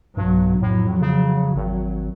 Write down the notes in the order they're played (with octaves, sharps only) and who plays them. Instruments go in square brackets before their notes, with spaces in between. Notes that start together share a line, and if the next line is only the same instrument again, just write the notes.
[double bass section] B1 F#3 [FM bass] G2
[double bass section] F2 F#3 [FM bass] A2
[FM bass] C#3
[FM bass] G#1 [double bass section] F#3